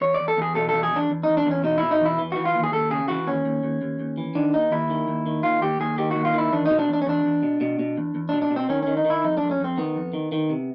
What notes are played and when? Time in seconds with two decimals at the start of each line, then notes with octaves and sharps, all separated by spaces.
0.01 E2 C#5
0.14 D5
0.20 E2
0.28 A4
0.37 E2 G#4
0.55 B2 A4
0.69 E2 A4
0.83 G#4
0.92 E2 D4
1.10 E2
1.23 E2 D#4
1.37 D4
1.46 E2 C#4
1.64 B2 D#4
1.78 B2 E4
1.91 D#4
2.01 E2 E4
2.18 E3
2.32 E3 F#4
2.45 F4
2.55 D#2
2.64 G#4
2.72 D#2 A4
2.90 C#3 G#4
3.08 E3 F#4
3.27 D#2 C#4
3.45 D#2
3.63 D#2
3.82 D#2
3.99 D#2
4.18 E3
4.35 D#3 D4
4.53 D#2 D#4
4.72 D#2 E4
4.90 D#3
5.08 D#2
5.26 D#3
5.43 D#2 F4
5.62 D#2 G4
5.80 D#2 G#4
5.98 D#3 G4
6.11 D#2 F#4
6.25 F4
6.34 D#3 E4
6.52 E2 D4
6.66 B2 D#4
6.79 D4
6.88 E2
6.93 D4
7.02 C#4
7.06 E2 D4
7.25 E2
7.43 B2
7.61 B2
7.79 B2
7.97 E2
8.15 E2
8.29 B2 D4
8.42 D4
8.51 B2
8.56 C4
8.69 D#3 C#4
8.83 D#3 C#4
8.97 D#4
9.05 D#3
9.10 E4
9.24 F2 D#4
9.37 F2 D4
9.51 C#4
9.60 F2 C4
9.78 D#3 B3
9.96 F2
10.13 D#3
10.32 D#3
10.50 C3